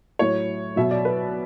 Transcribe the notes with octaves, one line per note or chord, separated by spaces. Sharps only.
A2 F#3 C#5
B2 F#3 E5
D5
B4